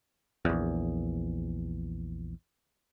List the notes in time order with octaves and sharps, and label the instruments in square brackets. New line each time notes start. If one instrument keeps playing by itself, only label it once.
[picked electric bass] A#1 E2